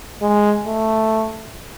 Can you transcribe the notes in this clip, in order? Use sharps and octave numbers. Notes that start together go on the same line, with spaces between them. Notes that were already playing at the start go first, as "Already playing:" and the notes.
G#3
A3